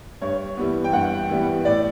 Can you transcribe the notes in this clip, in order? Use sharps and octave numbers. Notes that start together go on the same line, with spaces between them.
G2 C#5
E3 G3 B3
G5
G2 F#5
E3 G3 B3
A2 D5